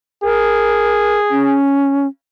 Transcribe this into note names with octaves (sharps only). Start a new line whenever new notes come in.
G#4 A#4
C#4